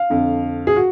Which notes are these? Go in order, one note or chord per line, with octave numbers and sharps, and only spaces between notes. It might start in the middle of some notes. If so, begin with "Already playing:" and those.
Already playing: F5
F2 D3
G#4
F#4